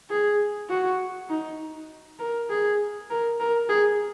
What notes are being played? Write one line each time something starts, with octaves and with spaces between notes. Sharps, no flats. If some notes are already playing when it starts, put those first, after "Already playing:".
G#4
F#4
D#4
A#4
G#4
A#4
A#4
G#4